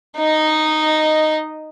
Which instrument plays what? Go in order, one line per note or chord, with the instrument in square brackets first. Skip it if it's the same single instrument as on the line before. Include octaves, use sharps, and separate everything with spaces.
[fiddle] D#4 D#5